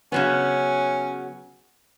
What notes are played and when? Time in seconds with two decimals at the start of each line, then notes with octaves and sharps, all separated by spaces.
0.12 C#3 F#3 B3 C#4